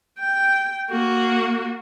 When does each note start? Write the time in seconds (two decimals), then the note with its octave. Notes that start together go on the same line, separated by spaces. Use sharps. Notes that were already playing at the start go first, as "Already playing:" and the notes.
0.19 G5
0.90 A#3 F#4